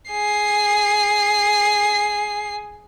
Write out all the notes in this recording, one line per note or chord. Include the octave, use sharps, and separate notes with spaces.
G#4 C7